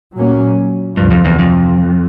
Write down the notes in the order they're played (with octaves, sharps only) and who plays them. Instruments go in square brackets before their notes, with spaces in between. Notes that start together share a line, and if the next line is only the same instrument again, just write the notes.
[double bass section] A#2 F#3 A#3 C#4
[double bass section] D2 C3 F3 [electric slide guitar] G2
[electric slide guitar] F2
E2
F2